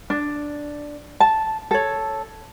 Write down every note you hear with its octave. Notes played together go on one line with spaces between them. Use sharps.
D4
A5
A4 C#5